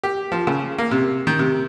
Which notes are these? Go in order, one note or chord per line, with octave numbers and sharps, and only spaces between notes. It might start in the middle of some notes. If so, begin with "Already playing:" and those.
G4
F3
C#3
A#3
C3
D#3
C3